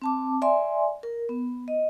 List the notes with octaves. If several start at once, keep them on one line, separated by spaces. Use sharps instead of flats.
C4 A5 D6
D5 E5 G#5 C6
A#4
B3
D#5